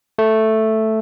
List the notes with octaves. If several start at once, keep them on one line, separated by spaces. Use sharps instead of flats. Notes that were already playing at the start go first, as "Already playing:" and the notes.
A3